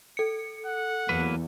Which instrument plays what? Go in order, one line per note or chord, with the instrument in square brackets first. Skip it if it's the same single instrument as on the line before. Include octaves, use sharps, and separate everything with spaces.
[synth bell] A4 C#7
[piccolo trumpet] F#5
[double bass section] E2 [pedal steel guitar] F#3 A#3 B4